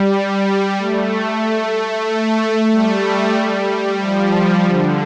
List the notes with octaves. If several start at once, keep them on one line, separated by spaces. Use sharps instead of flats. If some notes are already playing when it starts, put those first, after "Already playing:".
Already playing: G3
G3
A3
A3
G3
F3
D3